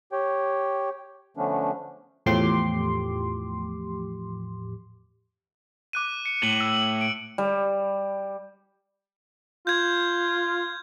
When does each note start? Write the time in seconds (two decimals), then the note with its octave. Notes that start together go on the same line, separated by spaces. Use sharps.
0.12 G4 C#5 G5
1.37 D3 F3 A3 B3 C#4 D4
2.26 E2 A2 F3 G4 C6 D6
5.93 D6 F#6 D#7
6.25 C#7
6.43 A2 F#7
6.61 E6
7.01 D7
7.38 G3
9.67 F4 G6 G#6